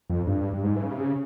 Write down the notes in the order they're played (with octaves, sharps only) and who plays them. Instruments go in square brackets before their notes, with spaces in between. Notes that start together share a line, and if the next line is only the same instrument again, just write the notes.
[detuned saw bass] F2
G2
G2
G#2
E3
C#3
C3
C#3